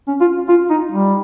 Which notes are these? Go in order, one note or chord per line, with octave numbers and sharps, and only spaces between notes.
C#4
F4
F4
D#4
G3